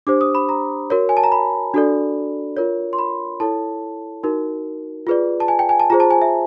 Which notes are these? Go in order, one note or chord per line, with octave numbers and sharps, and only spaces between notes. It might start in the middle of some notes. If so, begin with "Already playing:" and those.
D4 G4 C5 D6
D#6
B5
A#5
F#4 A#4 C#5
G#5
A5
A#5
B5
D4 F#4 A4 D5
F4 A#4 C#5
C6
B5
E4 A4 C#5 A5
D#4 F#4 A#4
F4 G#4 B4 D5
A5
G#5
G5
G#5
A5
F4 G#4 C5 A#5
A5
G#5
E5